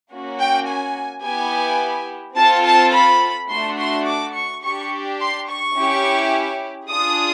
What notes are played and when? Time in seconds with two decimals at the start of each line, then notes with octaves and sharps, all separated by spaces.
0.11 A#3 C#4 F#4
0.39 G5
0.68 G#5
1.24 B3 E4 G4 G#5
2.38 C4 F4 A4 A5
2.66 A5
2.94 B5
3.50 A3 D4 F#4 C6
3.79 C6
4.07 D6
4.35 C#6
4.63 D4 G4 C#6
5.19 C6
5.48 C#6
5.76 C#4 E4 G4
6.89 D4 F4 G#4 D#6